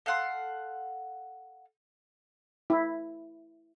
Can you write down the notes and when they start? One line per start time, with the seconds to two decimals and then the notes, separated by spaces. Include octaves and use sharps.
0.06 A4 F5 F#5 C6
2.70 E4